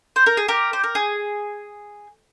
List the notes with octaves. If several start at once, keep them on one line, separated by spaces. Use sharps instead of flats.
C5
A#4
G#4
G4 A#4
C5
A#4
G#4